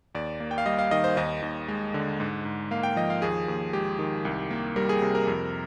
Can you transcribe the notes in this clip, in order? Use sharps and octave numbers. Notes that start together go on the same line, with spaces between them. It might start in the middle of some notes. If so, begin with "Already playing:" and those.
D#2 D5
A#3
G5
F5
G3 D#5
F5
D#3 D#5
C5
D#2 D#5
D#2
G#3
D3
G#2
G#2
A#3 F5
G5
F3 D#5
F5
D#2 G#4
D#2
G#3 G4
D#3
C2
A#3
G3 A#4
G#4
C3
A#4
F2